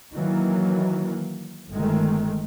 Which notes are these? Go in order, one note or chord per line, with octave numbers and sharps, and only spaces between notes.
D#3 E3 F#3 A#3
G1 D#3 G#3 A3